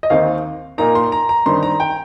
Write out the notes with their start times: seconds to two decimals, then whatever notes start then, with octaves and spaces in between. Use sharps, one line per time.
0.03 D#5
0.10 D#2 D#3 C4 D#4 F5
0.78 A#2 A#3 D#4 A#5
0.95 C6
1.12 A#5
1.29 A#5
1.46 G2 D#3 C4 D#4 C6
1.63 A#5
1.80 G5